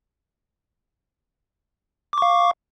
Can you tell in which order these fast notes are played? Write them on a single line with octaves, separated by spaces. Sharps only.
D6 C#6 F5